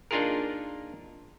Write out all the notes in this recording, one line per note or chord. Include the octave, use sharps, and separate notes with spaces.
A#3 D4 D#4 F4 G#4 A#4